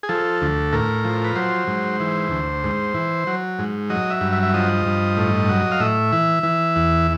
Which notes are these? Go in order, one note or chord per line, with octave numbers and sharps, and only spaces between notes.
G#4
F3 A4
D2
A2 A#4
F3
B4
F#3 C5
G#2
E3
D2
G#2
E3
F#3
G#2
F#3 D#5
E5
G2
E5
E5
F3 D#5
G2
A2
F#3
F5
A2 E5
E3
E3
E2